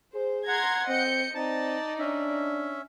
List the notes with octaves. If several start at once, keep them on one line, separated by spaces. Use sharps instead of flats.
G#4 C5
F#5 A#5 C6 G#6
C4 D#5 G6 C#7
C4 D#4 D5 A5
C#4 D4 E5